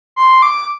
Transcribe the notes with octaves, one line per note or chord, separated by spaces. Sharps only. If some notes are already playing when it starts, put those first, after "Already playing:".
C6
D6